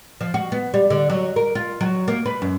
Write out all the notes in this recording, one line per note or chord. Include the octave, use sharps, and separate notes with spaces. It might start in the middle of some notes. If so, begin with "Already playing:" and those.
F3
F#4
B3
G3
D3
F#3
A#4
F4
F#3
A#3
B4
F#2